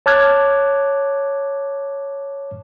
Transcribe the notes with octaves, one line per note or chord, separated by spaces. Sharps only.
C#5 A5 D6 F6 F#6 G#6